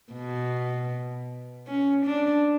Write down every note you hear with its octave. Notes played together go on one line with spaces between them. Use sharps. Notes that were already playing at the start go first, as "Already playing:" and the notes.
B2
C#4
D4